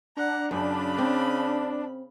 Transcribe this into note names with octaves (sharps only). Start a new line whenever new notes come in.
D4 F#5 A#5
F#2 C#3 B5
C4